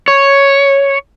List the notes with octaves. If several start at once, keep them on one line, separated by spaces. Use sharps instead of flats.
C#5